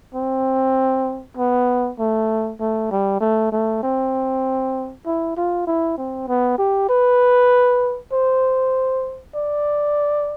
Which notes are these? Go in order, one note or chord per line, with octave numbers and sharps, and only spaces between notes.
C4
B3
A3
A3
G3
A3
A3
C4
E4
F4
E4
C4
B3
G4
B4
C5
D5